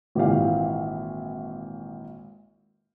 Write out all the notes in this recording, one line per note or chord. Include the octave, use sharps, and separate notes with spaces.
G#1 A#2 E3 G4 F5